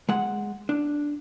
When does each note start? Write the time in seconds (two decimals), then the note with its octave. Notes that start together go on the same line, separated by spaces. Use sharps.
0.09 G#3 F#5
0.69 D4